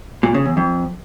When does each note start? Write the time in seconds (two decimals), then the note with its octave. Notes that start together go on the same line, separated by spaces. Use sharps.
0.23 A#2
0.34 C#3
0.46 E2
0.57 F2